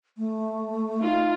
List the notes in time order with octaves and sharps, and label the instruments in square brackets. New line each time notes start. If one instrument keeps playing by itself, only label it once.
[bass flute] A3
[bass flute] D#4 [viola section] F4